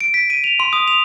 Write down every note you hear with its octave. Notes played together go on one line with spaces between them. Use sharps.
D7
B6
D#7
F7
C6
D#6
F7